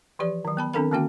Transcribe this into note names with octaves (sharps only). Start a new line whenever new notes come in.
E3 F3 G4 D5
D#3 F#3
B3 A5 B5
D#3 C4 D4 A4 A#4 B5
D3 D#3 A#3 C#4 F#4 G5